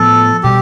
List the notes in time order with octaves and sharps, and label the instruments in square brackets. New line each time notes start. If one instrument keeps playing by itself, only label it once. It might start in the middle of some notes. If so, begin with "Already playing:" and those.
Already playing: [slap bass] A2 F3 B3 [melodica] A4
[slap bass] B2 G3 [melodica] G4